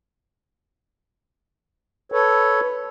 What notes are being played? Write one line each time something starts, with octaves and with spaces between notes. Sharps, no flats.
A4 B4 C#5